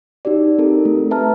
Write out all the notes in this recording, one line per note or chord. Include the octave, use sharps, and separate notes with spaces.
D#4 F#4 G4 D5
C4 D#4 G4 A4 A#4
A3
B4 E5 A5 A#5 F6